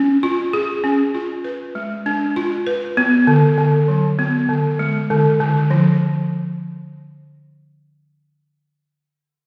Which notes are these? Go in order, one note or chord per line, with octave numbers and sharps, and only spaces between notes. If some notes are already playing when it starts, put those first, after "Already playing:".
Already playing: C#4
F4
G#4
C#4
F4
B4
G#3
D4
F4
B4
B3
D3
D3
F#3
B3
D3
G#3
D3
D3
F3